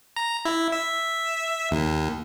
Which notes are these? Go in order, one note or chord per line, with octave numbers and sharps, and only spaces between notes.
A#5
E4
E5
D#2